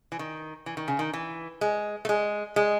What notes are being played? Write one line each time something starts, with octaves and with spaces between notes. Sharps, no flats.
E3
D#3
E3
D#3
C#3
D#3
E3
G#3
A3
G#3
G#3